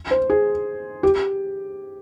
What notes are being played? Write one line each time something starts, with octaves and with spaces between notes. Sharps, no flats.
C5
G#4
G4